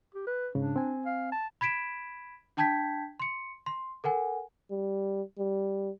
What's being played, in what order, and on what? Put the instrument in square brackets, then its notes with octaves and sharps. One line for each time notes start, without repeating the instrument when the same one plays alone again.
[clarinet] G4
B4
[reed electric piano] G#2 C#3 [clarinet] D4
[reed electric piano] C4 G#5
[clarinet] F5
A5
[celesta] B5 G#6 B6 D7 E7
D4 G5 A5 G6 G#6 B6
C6 C#7
C6
A4 A#4 F#5 G#5
[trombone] G3
G3